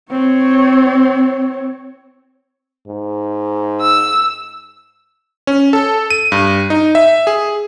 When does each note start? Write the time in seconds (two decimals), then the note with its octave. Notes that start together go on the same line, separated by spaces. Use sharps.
0.11 C4 C#5
2.87 G#2
3.81 E6
5.47 C#4
5.73 A4
6.10 D#7
6.32 G2
6.70 D#4
6.95 E5
7.27 G#4